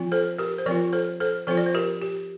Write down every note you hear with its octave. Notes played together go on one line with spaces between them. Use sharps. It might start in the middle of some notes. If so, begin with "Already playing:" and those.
Already playing: F3 C4 F4
A4 C5
G4 A#4
C5
F3 C4 F4 A#4 D5
A4 C5
A4 C5
F3 C4 F4 A4 C5
D5
C5
G4 A#4
G4